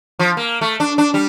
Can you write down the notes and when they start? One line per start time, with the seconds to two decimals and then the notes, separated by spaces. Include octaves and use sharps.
0.19 F3
0.37 A#3
0.61 A3
0.80 D4
0.98 D4
1.14 G3